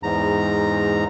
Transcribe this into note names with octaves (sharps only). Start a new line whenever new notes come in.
E2 G#2 A#5